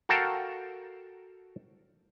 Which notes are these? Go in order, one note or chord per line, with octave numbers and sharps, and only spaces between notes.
F#4 A4 A#4 F5 G5 A5